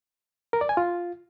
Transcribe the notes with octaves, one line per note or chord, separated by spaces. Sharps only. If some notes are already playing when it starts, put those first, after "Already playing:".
A#4
D5
G#5
F4